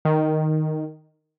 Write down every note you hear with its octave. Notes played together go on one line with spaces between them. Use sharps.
D#3